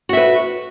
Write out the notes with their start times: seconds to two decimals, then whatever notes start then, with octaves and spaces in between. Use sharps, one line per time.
0.09 F#4
0.13 E5
0.17 B4